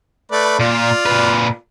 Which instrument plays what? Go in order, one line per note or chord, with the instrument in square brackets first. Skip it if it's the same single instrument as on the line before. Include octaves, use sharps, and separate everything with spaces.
[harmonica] A3 B4 D5
[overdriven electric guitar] A#2 [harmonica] F4 D5
[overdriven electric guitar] A#2 B4